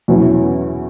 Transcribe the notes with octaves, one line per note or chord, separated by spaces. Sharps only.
E2 B2 F#3 C#4 E4